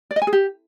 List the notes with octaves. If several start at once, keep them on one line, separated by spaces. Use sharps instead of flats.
D5
D#5
G#5
G#4
G4